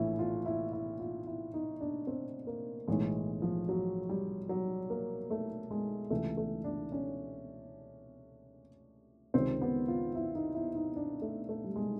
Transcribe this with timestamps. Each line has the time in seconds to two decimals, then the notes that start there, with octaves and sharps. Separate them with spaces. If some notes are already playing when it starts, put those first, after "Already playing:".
Already playing: A#1 A2 E3 E4
0.19 F4
0.46 E4
0.73 E4
1.00 F4
1.27 E4
1.54 D#4
1.81 D4
2.07 C4
2.47 A#3
2.88 B1 A2 E3 G#3
3.42 F3
3.69 F#3
4.09 G3
4.49 F#3
4.90 A#3
5.30 A3
5.71 G#3
6.10 C#2 C3 E3 A3
6.37 A3
6.64 D4
6.92 C#4
9.34 C#2 C3 D#3 C4
9.61 B3
9.88 F4
10.15 E4
10.35 D#4
10.55 E4
10.75 D#4
10.96 D4
11.22 A3
11.49 A3
11.64 G3
11.76 G#3